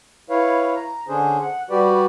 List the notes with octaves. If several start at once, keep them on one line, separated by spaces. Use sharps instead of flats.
E4 B4 C#5 F5
A#5
D3 C#4 D4 G#4 C5
F#5
G3 F#4 G4 B4 D5